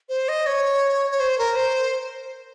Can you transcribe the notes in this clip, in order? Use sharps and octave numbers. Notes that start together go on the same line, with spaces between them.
C5
D#5
C#5
C#5
C5
A#4
C5